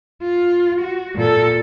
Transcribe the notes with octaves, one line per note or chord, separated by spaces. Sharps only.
F4
F#4
A#2 A4